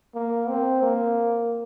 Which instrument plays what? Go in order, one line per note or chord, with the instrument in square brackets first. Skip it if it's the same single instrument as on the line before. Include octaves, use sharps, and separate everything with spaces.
[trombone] A#3
C4
A#3